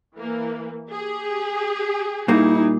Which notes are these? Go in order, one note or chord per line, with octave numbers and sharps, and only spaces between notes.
E3 A#3
G4 G#4
A#2 G3 A#3 D#4 E4